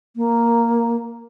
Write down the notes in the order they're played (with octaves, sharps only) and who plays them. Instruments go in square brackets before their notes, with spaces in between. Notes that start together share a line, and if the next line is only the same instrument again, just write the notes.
[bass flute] A#3